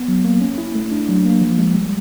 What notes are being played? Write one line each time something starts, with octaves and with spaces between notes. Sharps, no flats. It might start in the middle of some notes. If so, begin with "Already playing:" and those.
Already playing: B3
F#3
A#3
C#4
E4
A3
D4
F#3
A#3
F3
G#3
G3